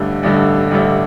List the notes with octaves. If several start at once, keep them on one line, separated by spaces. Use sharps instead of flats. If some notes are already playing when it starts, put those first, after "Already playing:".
Already playing: A1 G2 D3 A3
A1 G2 D3 A3
A1 G2 D3 A3